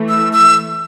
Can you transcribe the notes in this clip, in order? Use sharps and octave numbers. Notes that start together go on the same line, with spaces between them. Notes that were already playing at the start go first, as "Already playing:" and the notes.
Already playing: E3 A3
E6
E6